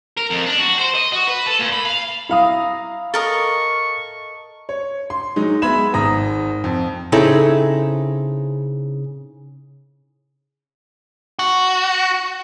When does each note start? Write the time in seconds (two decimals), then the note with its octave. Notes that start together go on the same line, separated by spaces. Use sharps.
0.17 A#4
0.30 F2
0.46 D4
0.59 F#4
0.79 C5
0.95 D#5
1.12 F#4
1.27 B4
1.47 A4
1.60 A#2
1.73 B5
1.85 F5
2.29 E4 F5 A#5 D#6
3.14 A4 A#4 D#5 C#6
4.69 C#5
5.10 C6
5.36 F#3 G#3 D#4
5.62 G#3 B3 E5 B5 G#6 E7
5.94 G#1 A#5 D#6 A#6
6.64 F2
7.12 C#3 C4 D#4 E4 G#4 A4
11.39 F#4